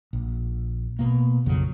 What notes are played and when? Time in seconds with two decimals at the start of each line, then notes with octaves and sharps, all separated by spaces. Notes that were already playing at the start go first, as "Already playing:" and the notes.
0.13 A#1
0.99 B2 A#3
1.46 A#1 F2 C#3 F#3